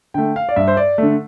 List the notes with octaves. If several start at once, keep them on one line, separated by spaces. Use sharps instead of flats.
D3 A3 G5
F5
D5
G2 E5
C5
D5
D3 A3